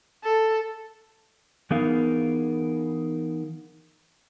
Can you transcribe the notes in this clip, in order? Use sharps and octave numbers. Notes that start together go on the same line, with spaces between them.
A4
E3 B3 D#4 G#4 A#4 F5